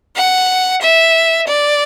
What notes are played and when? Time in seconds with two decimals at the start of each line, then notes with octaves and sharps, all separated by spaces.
0.16 F#5
0.82 E5
1.47 D5